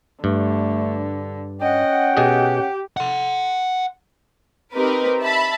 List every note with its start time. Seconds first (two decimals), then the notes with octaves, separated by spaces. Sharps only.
0.24 G2 D3 A3
1.61 C#4 D#5 F#5 G5
2.17 B2 G4 G#4 D#5
2.97 F#5 C6
4.75 C4 D#4 G4 A#4 B4
5.22 E5 A5 B5